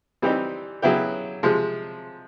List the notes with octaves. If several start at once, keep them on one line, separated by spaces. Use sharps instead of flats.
E3 G3 C4 D#4 G4
C#3 F#3 B3 E4 G4
C3 F3 G#3